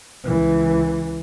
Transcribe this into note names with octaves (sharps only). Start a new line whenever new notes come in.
C#2 E3